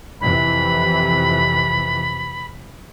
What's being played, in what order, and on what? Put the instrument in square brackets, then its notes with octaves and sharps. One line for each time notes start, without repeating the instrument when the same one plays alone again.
[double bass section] F2 C3 E3 [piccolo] B5